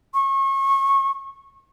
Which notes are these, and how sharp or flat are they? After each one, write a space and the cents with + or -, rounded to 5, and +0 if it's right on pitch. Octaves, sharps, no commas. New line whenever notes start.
C#6 -30